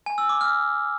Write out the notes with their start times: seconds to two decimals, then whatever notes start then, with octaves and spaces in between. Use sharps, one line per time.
0.06 G#5
0.18 E6
0.29 D6
0.41 F6